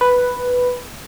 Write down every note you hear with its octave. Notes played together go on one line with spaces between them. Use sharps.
B4